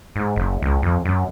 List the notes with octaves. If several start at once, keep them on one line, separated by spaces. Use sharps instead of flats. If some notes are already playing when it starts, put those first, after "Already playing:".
G#2
F#1
C#2
F2
F#2